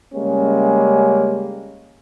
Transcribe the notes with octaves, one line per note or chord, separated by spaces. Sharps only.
C#3 G3 G#3 A#3 C#4